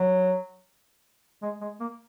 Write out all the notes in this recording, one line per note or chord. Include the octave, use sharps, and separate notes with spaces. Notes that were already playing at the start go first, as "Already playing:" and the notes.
Already playing: F#3
G#3
G#3
A#3